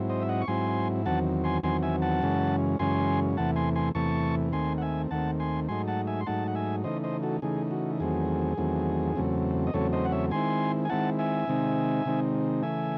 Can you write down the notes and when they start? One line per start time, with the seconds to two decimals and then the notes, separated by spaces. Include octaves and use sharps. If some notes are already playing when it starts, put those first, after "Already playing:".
Already playing: G#2 F#3 C4 E4
0.09 C5 D#5
0.22 E5
0.29 D#5 F#5
0.41 C#6
0.48 G#2 F#3 C4 E4 G#5 C6
1.06 E2 D#3 F#3 C4 F#5 A5
1.44 G#5 C6
1.63 E2 D#3 F#3 C4 G#5 C6
1.83 E5 G#5
2.02 F#5 A5
2.22 F#2 C#3 E3 G#3 C#4
2.79 F#2 C#3 E3 G#3 C#4 G#5 C6
3.37 E2 C3 E3 A3 F#5 A5
3.56 G#5 C6
3.75 G#5 C6
3.95 E2 C3 E3 A3 A5 C#6
4.53 D#2 D#3 A3 C4 G#5 C6
4.78 F#5
4.82 E5 G#5
5.11 D#2 D#3 A3 C4 F#5 A5
5.40 G#5 C6
5.68 G#2 F#3 A3 D#4 G#5 C6
5.88 F#5 A5
6.07 E5 G#5
6.21 C6
6.26 G#2 F#3 A3 D#4 F#5 A5
6.48 F#5
6.55 E5 G#5
6.84 C#3 E3 A3 D#4 C5 D#5
7.04 C5 D#5
7.23 F#4 A4
7.42 C#3 E3 A3 D#4 G#4
7.71 F#4
8.00 E2 D#3 F#3 A3 C4 G#4
8.58 E2 D#3 F#3 A3 C4
9.16 E2 C#3 F#3 A3 C4
9.67 D#5
9.74 E2 C#3 F#3 A3 C4 A4 C#5
9.93 C5 D#5
10.05 F#5
10.12 C#5 E5
10.31 D#3 G#3 C4 E4 G#5 C6
10.85 G#5
10.90 D#3 G#3 C4 E4 F#5 A5
11.19 E5 G#5
11.47 C3 D#3 G#3 C4 D#4
12.05 C3 D#3 G#3 C4 D#4
12.63 C#3 E3 A3 E5 G#5